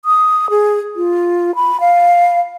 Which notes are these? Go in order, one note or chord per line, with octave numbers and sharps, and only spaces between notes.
D#6
G#4
F4
B5
F5